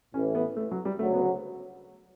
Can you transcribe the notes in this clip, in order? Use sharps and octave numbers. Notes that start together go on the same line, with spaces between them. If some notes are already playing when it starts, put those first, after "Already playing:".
A1 A2 E3 A3 C#4
B3
A3
F#3
G3
D2 C#3 F#3 A3
B3